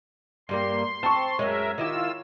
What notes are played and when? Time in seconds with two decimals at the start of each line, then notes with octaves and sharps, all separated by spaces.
0.49 G2 G3 A#3 C6
1.03 C4 A5 C#6
1.39 F#2 G#3 A#4 C#5 E5
1.78 D#3 E4 F4 G4 E6